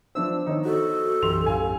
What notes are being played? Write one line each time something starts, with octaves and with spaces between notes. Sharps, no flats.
F3 B3 D4 C5 E5 E6
D#3 D#4 C#5
F#4 A4
B1 F#2 E3 G4 C6 F7
A2 F5 G#5